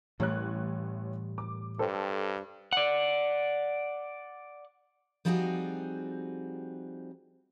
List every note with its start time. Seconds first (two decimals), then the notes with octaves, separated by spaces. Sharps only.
0.20 A1 A2 E3 G3 C#5 F#6
1.38 D6
1.79 G2 A4 C5 G5
2.73 D5 F#5
5.25 F3 G3 C4 D#4 F#4 G#4